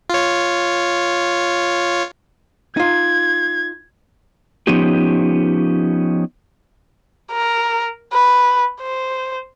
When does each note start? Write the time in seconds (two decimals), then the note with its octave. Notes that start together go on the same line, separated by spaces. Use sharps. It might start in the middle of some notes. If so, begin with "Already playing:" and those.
0.10 F4 C#5
2.77 D#4 F4 G#6
4.67 F3 B3 C#4 D#4 G4
7.32 A#4
8.13 B4
8.81 C5